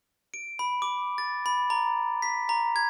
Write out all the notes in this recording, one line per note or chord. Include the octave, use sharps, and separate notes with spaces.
D7
B5
D6
A6
B5
A#5
B6
A#5
G#6